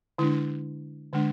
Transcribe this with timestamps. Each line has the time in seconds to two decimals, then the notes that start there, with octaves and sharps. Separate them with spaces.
0.18 D3 G#3 D4 E4
1.13 D3 G#3 D4